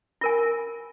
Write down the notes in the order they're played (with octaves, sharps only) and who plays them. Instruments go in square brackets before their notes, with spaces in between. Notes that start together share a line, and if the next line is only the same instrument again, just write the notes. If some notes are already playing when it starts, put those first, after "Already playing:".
[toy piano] F4 A#4 G#5